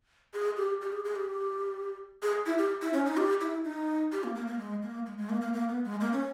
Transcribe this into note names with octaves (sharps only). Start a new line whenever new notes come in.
G#4
G4
G4
G#4
G#4
G4
G#4
E4
G4
E4
C#4
D#4
G4
E4
D#4
G4
A#3
A#3
A#3
G#3
A#3
G#3
G#3
A#3
A#3
A#3
B3
G#3
A#3
C#4